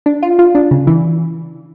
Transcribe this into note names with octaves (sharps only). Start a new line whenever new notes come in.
D4
F4
F4
D4
C#3
E3